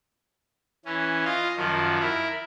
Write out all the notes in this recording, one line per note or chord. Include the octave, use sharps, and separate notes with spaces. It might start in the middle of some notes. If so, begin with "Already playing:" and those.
E3 C#4
F4 D#5 F5
F#2 D#3 F3
E4 A#4